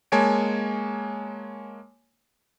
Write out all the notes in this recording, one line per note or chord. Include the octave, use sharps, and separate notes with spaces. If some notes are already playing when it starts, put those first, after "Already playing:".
G#3 A#3 C#5 G#5 A5 D7